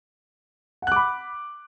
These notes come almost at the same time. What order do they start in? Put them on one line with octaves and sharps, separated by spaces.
F#5 F#6 D6 B5